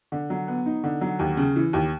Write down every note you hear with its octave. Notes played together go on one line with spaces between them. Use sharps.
D3
F#3
B3
D#4
D3
F#3
D#2
C#3
E3
D#2